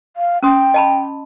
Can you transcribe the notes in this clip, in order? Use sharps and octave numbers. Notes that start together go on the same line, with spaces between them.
F5
C#4 G5 C6 D#6
D#5 A5 B5